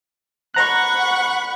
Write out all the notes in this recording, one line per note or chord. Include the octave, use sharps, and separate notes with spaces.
F#5 A#5 B5 C#6 F#6